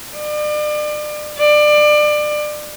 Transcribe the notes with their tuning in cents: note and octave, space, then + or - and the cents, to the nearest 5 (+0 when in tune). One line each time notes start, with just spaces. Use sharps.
D5 +35
D5 +25